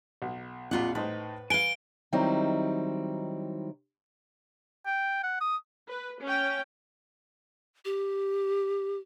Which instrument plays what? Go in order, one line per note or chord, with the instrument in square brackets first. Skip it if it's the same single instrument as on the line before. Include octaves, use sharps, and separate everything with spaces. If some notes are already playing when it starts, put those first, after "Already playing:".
[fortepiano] B1
[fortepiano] A#1 F2 A#2 [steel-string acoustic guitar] F4 F#5
[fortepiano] A2 D#4 C5 [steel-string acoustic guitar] B4
[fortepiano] B4 [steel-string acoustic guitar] F5 G#5 [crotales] D7 G7
[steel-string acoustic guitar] D#3 F#3 G3 C4 D#4 E4
[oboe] G5
F#5
D#6
[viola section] B4
C#4 G5
[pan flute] G4